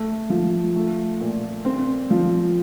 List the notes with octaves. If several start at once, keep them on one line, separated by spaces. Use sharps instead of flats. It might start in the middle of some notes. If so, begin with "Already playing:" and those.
Already playing: A3
F3
A3
A#2
C4
F3